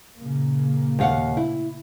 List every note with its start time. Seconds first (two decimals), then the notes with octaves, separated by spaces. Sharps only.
0.19 A#2 C#3 A#3
0.99 D#2 F5 F#5
1.37 E4